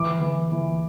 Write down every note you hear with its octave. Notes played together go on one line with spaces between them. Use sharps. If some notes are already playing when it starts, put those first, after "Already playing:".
Already playing: E3 D6
E3
E3